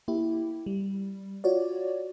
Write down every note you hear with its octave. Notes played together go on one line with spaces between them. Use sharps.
A#3 E4 G4
G3
F4 F#4 C#5 D5